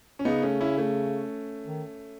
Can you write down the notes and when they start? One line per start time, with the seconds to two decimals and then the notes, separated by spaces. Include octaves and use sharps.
0.19 C#4
0.25 C#3 B3 D#4
0.42 A3 C#4
0.61 C#4 E4
0.78 A3 C#4
1.66 D#3